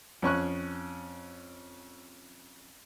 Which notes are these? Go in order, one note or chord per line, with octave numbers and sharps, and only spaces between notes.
F2 C#4 C#6 F#6